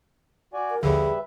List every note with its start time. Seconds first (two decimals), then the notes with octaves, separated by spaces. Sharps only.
0.53 F#4 D5 G#5
0.70 A#4
0.83 A#1 D#2 D3 G3 G#4 B4 E5